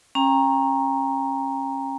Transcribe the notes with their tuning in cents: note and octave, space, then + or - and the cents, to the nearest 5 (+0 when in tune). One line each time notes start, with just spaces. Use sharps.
C#4 -30 G5 +30 A#5 +0